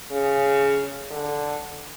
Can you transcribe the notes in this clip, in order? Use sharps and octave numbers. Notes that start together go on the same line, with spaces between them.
C#3
D3